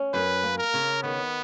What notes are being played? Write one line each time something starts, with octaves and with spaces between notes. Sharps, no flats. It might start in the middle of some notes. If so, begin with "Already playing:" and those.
Already playing: C#4
F#2 B4
A#3
A#4
C#3
D#3 B3